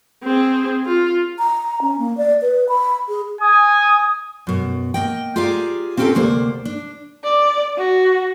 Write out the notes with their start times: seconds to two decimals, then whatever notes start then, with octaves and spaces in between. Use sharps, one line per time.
0.23 C4 G#4
0.86 F4
1.39 A#5
1.82 C#4
1.99 A#3
2.17 D5
2.42 B4
2.69 B5
3.08 G#4
3.41 G#5 D#6
4.47 F#2 B2
4.94 A#3 D#5 G5
5.36 F4 G4 G#4 D5 F5 A#5
5.97 C4 C#4 F4 G4 A4 A#4
6.15 D2 C3 A#3 C5 D5
6.65 D4
7.23 D5
7.77 F#4